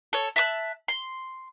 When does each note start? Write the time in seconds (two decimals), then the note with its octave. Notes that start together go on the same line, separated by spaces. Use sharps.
0.13 A4 C#5
0.36 E5 A5 C#6 F#6
0.88 C6